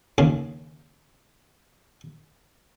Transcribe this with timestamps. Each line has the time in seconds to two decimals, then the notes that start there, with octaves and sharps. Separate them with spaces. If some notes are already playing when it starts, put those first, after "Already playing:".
0.18 D#2 C#3